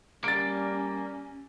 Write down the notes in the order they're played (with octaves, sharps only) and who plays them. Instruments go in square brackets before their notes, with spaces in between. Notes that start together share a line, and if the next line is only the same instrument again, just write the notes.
[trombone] G3 [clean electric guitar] A#3 [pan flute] C#4 [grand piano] A6 D7